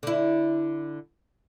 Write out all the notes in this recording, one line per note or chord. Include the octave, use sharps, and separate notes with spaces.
D3 E4